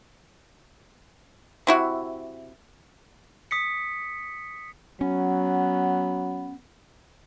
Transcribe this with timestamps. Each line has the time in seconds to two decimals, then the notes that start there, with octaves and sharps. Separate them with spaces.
1.67 C3 E4 F#4
3.51 D#6 B6 C#7
5.01 F#3 B3 C#4